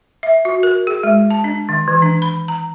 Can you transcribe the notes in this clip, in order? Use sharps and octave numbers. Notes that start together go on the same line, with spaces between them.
E5
F#4
A#4
G#4
G#3
A5
D4
D#3
E3
D4
B5
A#5